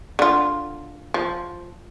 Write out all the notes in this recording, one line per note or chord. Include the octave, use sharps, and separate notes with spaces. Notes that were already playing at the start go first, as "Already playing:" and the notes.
D3 F4
F3